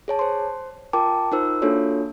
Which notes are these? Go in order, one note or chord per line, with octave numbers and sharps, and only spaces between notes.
G#4 C#5 A5
C5 C6
F4 A#4 G5 A5 D6
D#4 F4 A#4 C5 E6
A#3 D4 F4 F#4 A4 C#5